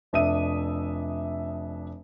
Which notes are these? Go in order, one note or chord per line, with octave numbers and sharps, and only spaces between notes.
F1 D4 E5 D#6 D#7